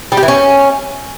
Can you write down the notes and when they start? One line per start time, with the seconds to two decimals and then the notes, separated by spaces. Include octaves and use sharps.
0.12 G3
0.17 G4
0.23 E3
0.28 C#4